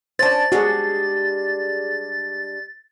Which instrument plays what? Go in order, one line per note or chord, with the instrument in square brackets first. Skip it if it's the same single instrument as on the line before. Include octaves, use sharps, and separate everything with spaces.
[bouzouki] C#4 D4 [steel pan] C5 A5 [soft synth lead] A6
[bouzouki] G3 G#3 D4 [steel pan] F#4 G#4